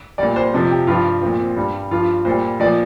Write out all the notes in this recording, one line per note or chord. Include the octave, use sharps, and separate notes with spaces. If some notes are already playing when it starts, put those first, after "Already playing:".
A#2 G3 D5
C5
F2 C3 F3
G4
G2 F3 F4
A#2 F3 C4
C4
G2 G3
G2 F3 F4
A#2 G3 C5
A#2 F3 D5